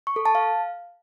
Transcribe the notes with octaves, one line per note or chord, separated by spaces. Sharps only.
C#6
A4
A5
F5